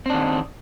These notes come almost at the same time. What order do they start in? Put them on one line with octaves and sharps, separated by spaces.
C4 D4 D#3